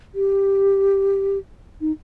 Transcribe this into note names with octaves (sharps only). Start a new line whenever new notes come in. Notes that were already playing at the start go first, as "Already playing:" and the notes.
G4
D#4